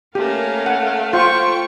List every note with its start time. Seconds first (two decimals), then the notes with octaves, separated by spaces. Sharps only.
0.15 A3 A#3 C#4 G4 A#4 F5
0.66 F#5
1.13 F4 C5 G5 C#6